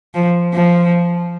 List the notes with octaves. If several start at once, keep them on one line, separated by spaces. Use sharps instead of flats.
F3
F3